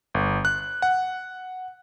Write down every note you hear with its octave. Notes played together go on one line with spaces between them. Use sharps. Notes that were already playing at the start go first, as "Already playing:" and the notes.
G1
F#6
F#5